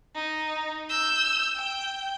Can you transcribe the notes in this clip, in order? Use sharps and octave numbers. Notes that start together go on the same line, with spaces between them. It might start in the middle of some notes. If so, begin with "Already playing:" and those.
D#4
E6 G6
G5